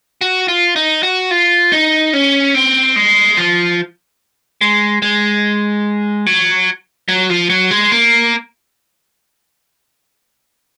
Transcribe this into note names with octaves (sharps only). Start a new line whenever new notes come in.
F#4
F4
D#4
F#4
F4
D#4
C#4
C4
G#3
F3
G#3
G#3
F#3
F#3
F3
F#3
G#3
A#3